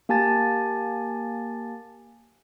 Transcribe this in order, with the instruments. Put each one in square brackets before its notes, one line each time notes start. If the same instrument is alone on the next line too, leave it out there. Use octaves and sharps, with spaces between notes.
[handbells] A#3 G4 G#5 A5 A6